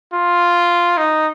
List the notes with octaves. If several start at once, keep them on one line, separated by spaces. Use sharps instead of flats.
F4
D#4